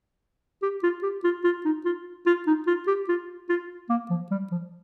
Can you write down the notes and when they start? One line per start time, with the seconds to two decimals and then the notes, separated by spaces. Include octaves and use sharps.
0.62 G4
0.83 F4
1.03 G4
1.24 F4
1.44 F4
1.65 D#4
1.85 F4
2.26 F4
2.47 D#4
2.67 F4
2.87 G4
3.08 F4
3.49 F4
3.90 A#3
4.10 F3
4.31 G3
4.52 F3